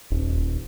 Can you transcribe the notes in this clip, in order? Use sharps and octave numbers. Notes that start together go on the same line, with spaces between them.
D#1